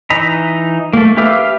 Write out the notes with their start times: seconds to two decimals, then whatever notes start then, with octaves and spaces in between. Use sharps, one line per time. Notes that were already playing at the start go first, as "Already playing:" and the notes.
0.10 E3 D#4 A#5 B5
0.93 A3 A#3
1.17 G4 B4 E5 F5 D6